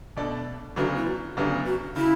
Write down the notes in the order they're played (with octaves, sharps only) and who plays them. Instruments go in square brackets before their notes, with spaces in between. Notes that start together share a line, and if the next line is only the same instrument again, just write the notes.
[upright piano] B2 A3 D4 A4 D5
[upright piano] D2 C#3 F#3 B3 D4 [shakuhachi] F#4
[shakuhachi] E4
F#4
[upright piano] D2 C#3 F#3 B3 D4 [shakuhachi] G4
[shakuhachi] F#4
[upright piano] C#3 [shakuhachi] E4